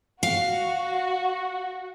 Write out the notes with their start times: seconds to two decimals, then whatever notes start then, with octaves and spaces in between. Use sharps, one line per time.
0.23 F#4 F5